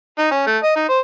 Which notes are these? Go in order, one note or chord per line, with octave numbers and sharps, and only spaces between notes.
D#4
C#4
A3
D#5
D#4
C5